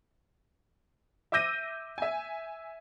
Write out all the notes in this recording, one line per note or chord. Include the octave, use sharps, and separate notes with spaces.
E5 D6 E6 G6 A#6 D#7
E5 G#5